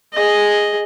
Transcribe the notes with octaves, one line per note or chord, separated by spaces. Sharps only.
G#4 D#5